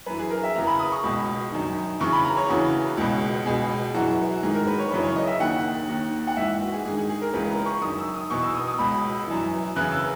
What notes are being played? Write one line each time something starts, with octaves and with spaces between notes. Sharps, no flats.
F#2 E3 B4
G#4
A#4
E5
E2 C#3 E3 A#5
B5
D#6
C#6
C#2 B2
F#2 D#3
E2 C#3 E3 C#6
B5
A#5
C#5
E2 C#3 E3 F#4
C#2 B2
C#2 B2 G#4
F#2 E3 F#4
G#2 D#3 G#4
A#4
B4
C#5
F#2 C#3 E3 B4
C#5
D#5
E5
D#2 D#3 F#5
D#2 D#3
F#5
G#2 E3 E5
F#4
G#4
G#2 D#3 G#4
G#4
G#4
A#4
C#2 C#3 E3 B4
A#5
C#6
F#2 D#3 D#6
E6
D#6
E2 B2 C#6
E6
D#6
D#6
C#2 B2 B5
F#2 E3
E2 C#3 E3 F#6
E6